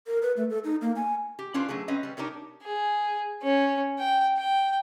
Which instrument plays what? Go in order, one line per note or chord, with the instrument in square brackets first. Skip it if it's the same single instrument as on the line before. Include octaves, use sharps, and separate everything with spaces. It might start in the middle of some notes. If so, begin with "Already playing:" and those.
[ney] A#4
B4
A3
A4
D#4
A#3
G#5
[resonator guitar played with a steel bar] G4
C#4 D4 F4 B4 C5
F#3 A3 C#4 G#4
C4 C#4 B4 D#5
G3 C#4
D4 D#4 G4 A#4 C#5
[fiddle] G#4
C#4
G5
G5